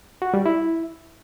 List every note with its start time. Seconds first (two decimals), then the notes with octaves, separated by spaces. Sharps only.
0.22 F#4
0.34 G3
0.46 E4